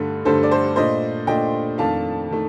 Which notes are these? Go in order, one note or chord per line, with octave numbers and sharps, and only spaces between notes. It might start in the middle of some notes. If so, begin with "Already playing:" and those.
Already playing: G2 D3 A3
G2 D3 A3 A4 C5
D5
A4 C5
A#2 A3 D4 C5 D#5
A#2 A3 D4 D#5 G5
F2 D#3 A3 D4 F5 A5
D#3 A3